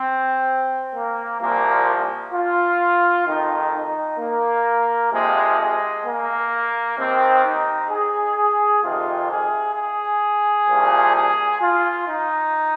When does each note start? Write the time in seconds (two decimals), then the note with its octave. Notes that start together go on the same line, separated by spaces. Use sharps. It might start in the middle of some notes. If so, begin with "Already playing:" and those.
Already playing: C4
0.95 A#3
1.41 C2 A#2 F3 A#3
2.34 F4
3.27 F2 D#3 D#4
3.74 D#4
4.19 A#3
5.12 F2 C3 F3 G#3
5.59 G#3
6.06 A#3
6.97 D#2 D#3 C4
7.44 D#4
7.90 G#4
8.36 G#4
8.83 F2 C3 D#3 F4
9.29 G#4
9.75 G#4
10.67 C2 A#2 F3
11.14 G#4
11.61 F4
12.07 D#4